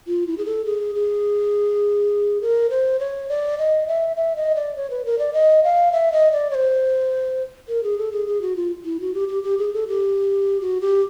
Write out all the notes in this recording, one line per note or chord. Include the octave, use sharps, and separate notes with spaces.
F4
E4
G#4
A4
G#4
G#4
A#4
C5
C#5
D5
D#5
E5
E5
D#5
D5
C#5
B4
A#4
D5
D#5
F5
E5
D#5
D5
C#5
C5
A#4
G#4
A4
G#4
G#4
F#4
F4
E4
F#4
G4
G4
G4
G#4
A4
G4
F#4
G4